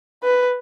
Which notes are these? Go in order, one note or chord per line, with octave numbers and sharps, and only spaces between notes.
B4